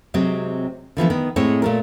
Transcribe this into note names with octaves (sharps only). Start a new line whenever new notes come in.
C3 F#3 G#3 C4
D3 E3 F3 B3
D#3 B3
A2 G#3 C4 G#4 C#5
A#2 A3 A#4